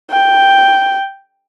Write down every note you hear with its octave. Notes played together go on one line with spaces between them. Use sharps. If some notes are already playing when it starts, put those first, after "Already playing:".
G5